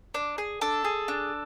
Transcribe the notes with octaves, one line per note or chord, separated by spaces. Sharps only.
D4
G#4
D4 A4
G#4
D4